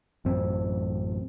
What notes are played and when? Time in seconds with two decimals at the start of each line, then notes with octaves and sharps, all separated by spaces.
0.25 A1 F#2 C4